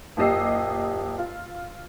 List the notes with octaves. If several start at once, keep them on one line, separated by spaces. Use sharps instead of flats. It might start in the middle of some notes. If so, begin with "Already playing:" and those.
F#1 A#2 G4 D#5 E6 C7
F4